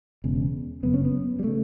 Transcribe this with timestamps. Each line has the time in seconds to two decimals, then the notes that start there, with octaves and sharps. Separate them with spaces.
0.24 E1 E2 C#3
0.83 F#1 F#2 C#3 B3
0.94 C#4
1.05 B3
1.39 G3
1.44 C#3 A3